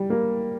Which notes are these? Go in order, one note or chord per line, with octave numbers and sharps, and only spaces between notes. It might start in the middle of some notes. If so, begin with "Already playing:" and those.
Already playing: G3
A#3